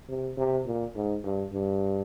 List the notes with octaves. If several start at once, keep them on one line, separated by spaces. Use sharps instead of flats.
C3
C3
A#2
G#2
G2
G2